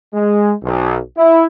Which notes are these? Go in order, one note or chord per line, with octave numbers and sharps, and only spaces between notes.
G#3
B1
E4